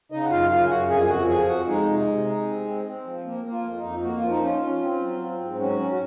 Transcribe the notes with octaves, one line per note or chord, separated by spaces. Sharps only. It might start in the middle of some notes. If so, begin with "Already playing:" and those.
C#3 D#4 D#5
F#5
F#2 F4 F5
C#3 F4 F5
G#5
F#2 F#4 F#5
F2 G#4 G#5
G#5
F2 F#4 F#5
F3 G#4 G#5
F2 F#4 F#5
G#3 D#4 G#4
C3
C3
D#4
C4
C4
C4
F3
A#3
A#3
F4
F2
D#4
F2
A#3 F#4
F4
F3
D#4
C#4 F4
C#4
C4
F#3
C4
G#2
F#3 C#4 F#4
C#4
F#4